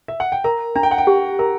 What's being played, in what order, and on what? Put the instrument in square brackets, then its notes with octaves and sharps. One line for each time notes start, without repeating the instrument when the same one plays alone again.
[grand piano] E5
F#5
G5
[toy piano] A#4 [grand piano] A#5
[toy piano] D4 [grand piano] A#5
[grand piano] G5
F#5
G5
[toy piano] G4
[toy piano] A#4 [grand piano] A#5